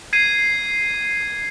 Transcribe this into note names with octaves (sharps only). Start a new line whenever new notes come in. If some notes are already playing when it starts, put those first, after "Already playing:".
G#6 C7 D#7